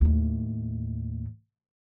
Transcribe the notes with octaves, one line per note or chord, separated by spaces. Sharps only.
D#2 A2